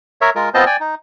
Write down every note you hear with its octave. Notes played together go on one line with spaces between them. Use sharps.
A#4 C#5 E5
G#3 F4 A#4
B3 C4 F4 C5 D#5 A5
D5 G5 G#5
D#4